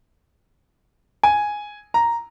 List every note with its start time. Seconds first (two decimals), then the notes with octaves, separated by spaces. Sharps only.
1.23 G#5
1.94 A#5